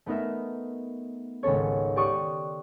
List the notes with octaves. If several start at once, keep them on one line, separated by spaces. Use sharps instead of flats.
A3 B3 D#4 A#4 E5
G#1 C#2 C#4 A4 C#5
G4 D5 C#6 D#6 F#6